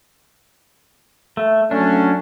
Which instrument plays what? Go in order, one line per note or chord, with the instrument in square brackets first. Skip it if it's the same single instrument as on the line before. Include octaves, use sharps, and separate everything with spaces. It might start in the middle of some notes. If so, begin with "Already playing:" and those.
[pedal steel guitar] A3
[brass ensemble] F#3 A3 C#4 [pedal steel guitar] D4